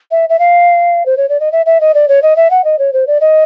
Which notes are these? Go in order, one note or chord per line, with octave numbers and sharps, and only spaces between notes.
E5
E5
F5
C5
C#5
D5
D#5
E5
E5
D#5
D5
C#5
D#5
E5
F#5
D#5
C#5
C5
D5
D#5